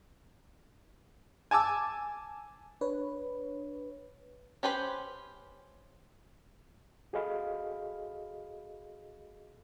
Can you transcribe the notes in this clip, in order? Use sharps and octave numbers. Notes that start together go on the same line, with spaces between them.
G#5 A5 D6 E6
D4 B4 C#5
C#4 G4 B4 C5
F#4 G#4 A4 D#5 F5 B5